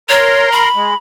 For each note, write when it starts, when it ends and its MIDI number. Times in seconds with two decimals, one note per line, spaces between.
0.09 0.69 70
0.09 0.51 73
0.09 0.69 82
0.09 0.69 84
0.52 0.96 83
0.76 0.94 56